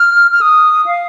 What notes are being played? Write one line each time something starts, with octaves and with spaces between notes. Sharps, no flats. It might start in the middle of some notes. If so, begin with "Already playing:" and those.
Already playing: F6
F6
D#6
F5